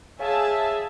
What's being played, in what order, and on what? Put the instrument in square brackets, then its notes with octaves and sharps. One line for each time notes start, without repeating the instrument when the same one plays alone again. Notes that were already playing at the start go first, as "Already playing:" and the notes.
[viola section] G#4 E5 A5 [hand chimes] C#5 F5 G#5